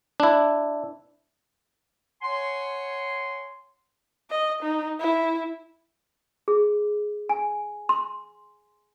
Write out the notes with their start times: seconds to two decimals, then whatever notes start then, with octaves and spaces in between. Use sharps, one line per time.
0.20 D4 E4
2.22 C#5 F#5 G#5 C6
4.30 D#5
4.63 D#4
5.00 E4
6.48 G#4
7.29 G#5
7.89 C6